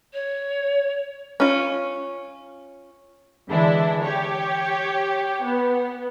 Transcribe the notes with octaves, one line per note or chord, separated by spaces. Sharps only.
C#5
C#4 F4
D3 E3 G#3 D4 E4
G4 C#5
B3